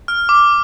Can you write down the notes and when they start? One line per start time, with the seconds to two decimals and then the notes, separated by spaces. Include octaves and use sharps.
0.08 F6
0.29 D6